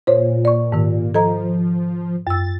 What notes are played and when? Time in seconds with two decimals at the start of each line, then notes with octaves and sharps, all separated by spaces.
0.07 A#2 C5 C#5
0.45 D5 C#6
0.72 G#2 D#3
1.14 F3 A4 D#5 A#5
2.27 F#2 E6 A6